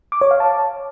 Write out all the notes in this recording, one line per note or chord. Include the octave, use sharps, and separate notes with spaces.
D6
C#5
F5
A5